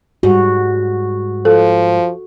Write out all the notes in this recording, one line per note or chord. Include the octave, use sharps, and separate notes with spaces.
G#2 G3 F#4
F3 A4